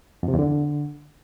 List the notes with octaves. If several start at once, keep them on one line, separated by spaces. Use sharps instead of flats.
F2
C3
E2
D3